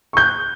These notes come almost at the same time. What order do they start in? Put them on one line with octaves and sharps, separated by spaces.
C#6 G6 F#6